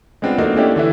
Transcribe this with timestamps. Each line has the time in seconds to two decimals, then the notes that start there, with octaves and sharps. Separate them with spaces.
0.22 G#3 B3 C4 D4 F4
0.38 A3 A#3 C4 D4 D#4 F#4
0.56 A3 C#4 D4 E4 G4
0.76 D3 E3 E4